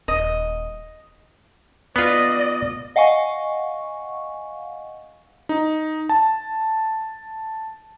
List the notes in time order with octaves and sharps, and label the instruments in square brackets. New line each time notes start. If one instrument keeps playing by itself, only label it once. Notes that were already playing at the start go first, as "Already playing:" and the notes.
[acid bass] D#1 [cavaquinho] D#5
[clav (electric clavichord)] B3 F4 [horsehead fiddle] D5 D#5
[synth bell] D#5 F5 F#5 G#5 C#6
[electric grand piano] D#4
A5